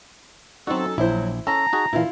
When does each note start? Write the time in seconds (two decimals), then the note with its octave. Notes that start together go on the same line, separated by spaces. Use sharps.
0.67 F#3 C4 C#4 D#4 F#4 A4
0.98 A#1 F#3 E4 C5
1.47 C#4 A4 A5 A#5
1.73 D#4 F#4 G#4
1.93 A#2 E3 E4 F4 F5